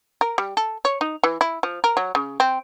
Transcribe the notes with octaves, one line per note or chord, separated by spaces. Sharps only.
A#4
G3
A4
C#5
D#4
E3
E4
F3
A#4
F#3
C#3
C4